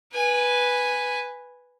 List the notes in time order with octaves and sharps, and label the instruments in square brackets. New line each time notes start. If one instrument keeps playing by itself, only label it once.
[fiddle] B4 G#5